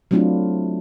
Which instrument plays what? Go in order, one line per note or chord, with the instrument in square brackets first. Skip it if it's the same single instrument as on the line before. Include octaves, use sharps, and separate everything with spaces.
[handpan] F#3 A3 C4 D4 E4 F4